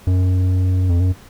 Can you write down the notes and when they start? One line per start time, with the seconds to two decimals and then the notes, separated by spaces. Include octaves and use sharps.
0.07 F#2
0.89 F2
1.00 F#2